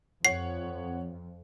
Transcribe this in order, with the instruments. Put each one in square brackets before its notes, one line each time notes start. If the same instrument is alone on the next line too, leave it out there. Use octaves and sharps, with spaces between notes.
[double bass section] F2 [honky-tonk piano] C#5 F#5 [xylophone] C7